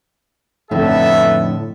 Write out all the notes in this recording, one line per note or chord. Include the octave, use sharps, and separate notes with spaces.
F2 A2 D3 B3 D#4 A4 E5